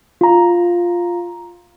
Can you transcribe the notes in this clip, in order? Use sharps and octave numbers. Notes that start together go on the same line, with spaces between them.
F4 A#5